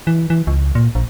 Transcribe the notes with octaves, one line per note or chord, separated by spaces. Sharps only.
E3
E3
C#2
A#2
A#1